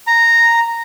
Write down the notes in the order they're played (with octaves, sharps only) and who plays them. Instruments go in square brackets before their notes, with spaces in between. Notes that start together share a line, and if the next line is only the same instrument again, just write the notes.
[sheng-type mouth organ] A#5